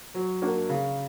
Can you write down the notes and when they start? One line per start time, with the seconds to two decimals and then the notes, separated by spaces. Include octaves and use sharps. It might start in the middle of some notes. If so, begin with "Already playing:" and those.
0.14 F#3
0.42 A#3 D4 F#4
0.69 C#3